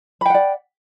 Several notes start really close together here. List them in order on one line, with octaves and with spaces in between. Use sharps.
B5 G5 F#5 D5